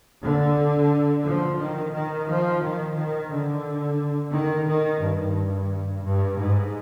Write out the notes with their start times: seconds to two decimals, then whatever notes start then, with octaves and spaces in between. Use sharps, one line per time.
0.22 D3
1.25 F3
1.59 D#3
1.93 D#3
2.27 F3
2.62 D#3
2.95 D#3
3.30 D3
4.33 D#3
4.67 D#3
5.01 G2
6.04 G2
6.37 G#2